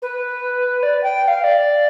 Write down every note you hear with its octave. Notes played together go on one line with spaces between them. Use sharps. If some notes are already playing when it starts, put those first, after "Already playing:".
B4
D5
G5
G5
F5
D5